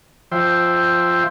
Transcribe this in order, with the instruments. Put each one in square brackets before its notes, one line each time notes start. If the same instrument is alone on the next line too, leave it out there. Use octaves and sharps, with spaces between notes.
[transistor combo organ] F3 C5 E5 G5